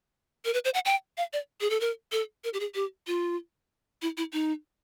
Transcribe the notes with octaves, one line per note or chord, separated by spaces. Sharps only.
A#4
B4
C5
F#5
G5
F5
D5
G#4
A4
A#4
A4
A#4
G4
G#4
G4
F4
E4
E4
D#4